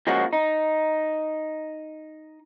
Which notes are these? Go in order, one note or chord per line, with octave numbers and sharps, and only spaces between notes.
F3 G#3 A#3 C#4 F#4
D#4